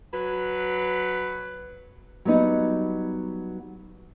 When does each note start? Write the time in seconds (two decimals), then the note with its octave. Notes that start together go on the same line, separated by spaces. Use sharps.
0.13 F#3 B4
2.25 F#3 G3 B3 D#4